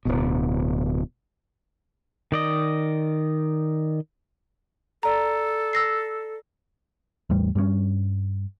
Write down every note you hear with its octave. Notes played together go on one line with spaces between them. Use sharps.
D1 G1 B2
D#3 D5 D#5
A4 D5 A#5
E6 A#6 C7
E2 A2 G3
G2 G3 A3 C#4